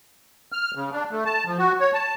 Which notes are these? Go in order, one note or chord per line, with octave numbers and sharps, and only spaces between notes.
F6
C#3
D4
A3
A5
F3
F#4
C#5
A5